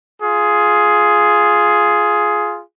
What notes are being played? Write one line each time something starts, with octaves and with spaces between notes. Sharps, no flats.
F4 G#4